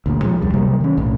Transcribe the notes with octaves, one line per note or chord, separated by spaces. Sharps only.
D2 A#2
F3 G#3
C2 F2 G3
C3 F#3 G3 A#3
D#3 C#4
B1 A2